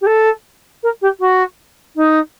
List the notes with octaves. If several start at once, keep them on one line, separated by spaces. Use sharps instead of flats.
G4
A4
A#4
G4
F#4
D#4